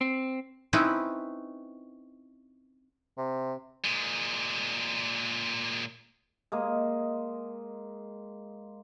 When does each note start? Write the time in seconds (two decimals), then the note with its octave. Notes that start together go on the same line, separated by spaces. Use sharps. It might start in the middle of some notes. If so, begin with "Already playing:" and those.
0.01 C4
0.73 C4 C#4 D#4 E4 B4
3.18 C3
3.84 A#2 G#3
6.52 G#3 A#3 D#5